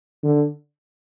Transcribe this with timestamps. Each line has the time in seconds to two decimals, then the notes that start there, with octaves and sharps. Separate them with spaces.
0.24 D3